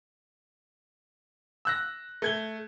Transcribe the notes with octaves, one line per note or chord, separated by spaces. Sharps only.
E6 F#6 A#6
A3 G#6 G7